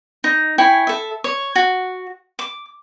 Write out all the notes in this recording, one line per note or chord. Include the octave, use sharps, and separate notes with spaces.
D#4
E4 C#5 G5 G#5
A4 E5
C#5
F#4
D6